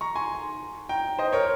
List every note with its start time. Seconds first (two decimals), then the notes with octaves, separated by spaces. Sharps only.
0.01 A#5 C#6
0.16 G#5 C6
0.89 G5 A#5
1.19 C5 D#5
1.33 A#4 C#5